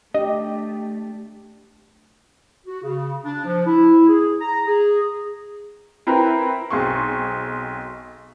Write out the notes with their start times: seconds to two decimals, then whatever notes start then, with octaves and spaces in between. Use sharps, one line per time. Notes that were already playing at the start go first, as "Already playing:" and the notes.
0.14 A3 D4 G4 D#5
2.67 F#4
2.83 C#3
3.25 D4
3.46 F3
3.66 E4
4.09 G#4
4.41 A#5
4.67 G#4
6.07 C4 E4 A#4 B4
6.70 B1 C4 G#4 C6 C#6